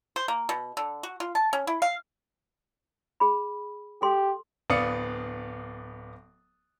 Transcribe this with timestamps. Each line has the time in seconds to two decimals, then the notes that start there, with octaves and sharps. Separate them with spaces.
0.16 C5
0.28 A#3
0.49 B2
0.77 D3
1.03 F#4
1.20 F4
1.35 A5
1.53 C#4
1.67 E4
1.82 F5
3.20 G#4 B5
4.02 G4 A4 C6
4.70 D1 B3 D5 F5 D#6 C#7